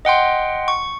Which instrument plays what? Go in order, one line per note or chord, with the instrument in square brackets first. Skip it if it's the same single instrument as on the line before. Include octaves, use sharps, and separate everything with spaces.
[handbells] D#5 F#5 G5 C6
C#6